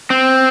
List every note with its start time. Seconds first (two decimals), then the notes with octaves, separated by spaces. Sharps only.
0.10 C4